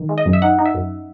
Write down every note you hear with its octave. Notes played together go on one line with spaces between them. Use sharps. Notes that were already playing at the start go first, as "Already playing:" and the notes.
Already playing: D#3
G#3
D#5
F#2
E5
D#4 F#5
D#4
E5
F#2